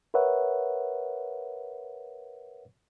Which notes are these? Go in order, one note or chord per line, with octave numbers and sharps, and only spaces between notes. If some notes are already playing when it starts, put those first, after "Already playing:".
A#4 B4 C#5 E5 F#5